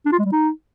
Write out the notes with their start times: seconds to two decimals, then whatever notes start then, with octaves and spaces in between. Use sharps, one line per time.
0.06 D4
0.12 F4
0.19 G#3
0.25 G3
0.32 D#4